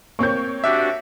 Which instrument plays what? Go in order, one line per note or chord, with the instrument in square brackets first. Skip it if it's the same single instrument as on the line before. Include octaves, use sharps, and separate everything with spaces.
[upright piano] A#3 C4 C#5 [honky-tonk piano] C#6 G6
[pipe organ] D4 F#4 G4 [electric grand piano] E5